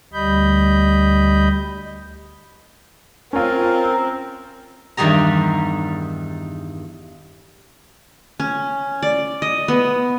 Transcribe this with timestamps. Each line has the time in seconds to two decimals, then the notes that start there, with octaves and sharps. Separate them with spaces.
0.13 D2 G3 D#5 B5 G6
3.33 C4 C#4 F4 A#4
4.97 E2 G2 D#3 G3 G#4 A#5
8.40 C#4
9.02 D5
9.42 D#5
9.68 B3